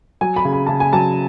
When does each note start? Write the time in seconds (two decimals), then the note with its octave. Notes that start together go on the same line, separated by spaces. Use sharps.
0.21 F#3 G#5
0.36 B5
0.45 C#3
0.53 B5
0.66 C#3 A5
0.80 G#5
0.93 F#3 A5